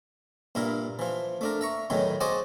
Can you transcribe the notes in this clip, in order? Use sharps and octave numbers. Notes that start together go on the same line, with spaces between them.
G2 A#2 E4 A#4
E3 F3
A3 D4 A#4
E5 A#5 C#6
E2 A2 D#3 E3 F#3
F#4 G#4 C5 D5 D#5 F#5